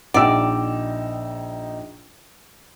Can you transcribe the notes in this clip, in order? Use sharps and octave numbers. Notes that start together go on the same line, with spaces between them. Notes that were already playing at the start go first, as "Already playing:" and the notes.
A#1 D#4 D5 F#5 G5 E6